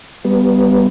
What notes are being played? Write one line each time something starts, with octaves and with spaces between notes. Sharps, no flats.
G3 B3